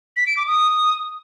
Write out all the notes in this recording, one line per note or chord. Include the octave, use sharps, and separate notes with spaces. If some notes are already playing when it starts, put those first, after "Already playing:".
B6
D7
D6
D#6